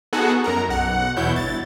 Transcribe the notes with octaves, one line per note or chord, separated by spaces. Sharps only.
B3 D#4 F#4 G#4 A4 F#5
F#2 A#4 A#5
B1 F#5
E2 B2 E4 C#5 G6
G1 A6